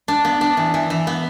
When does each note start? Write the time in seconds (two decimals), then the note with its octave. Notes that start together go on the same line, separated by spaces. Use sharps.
0.08 D4
0.25 B3
0.41 D4
0.57 E3
0.74 E3
0.90 E3
1.07 B3